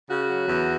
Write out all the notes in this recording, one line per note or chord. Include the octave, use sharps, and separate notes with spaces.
C#3 F#4
F#3
E2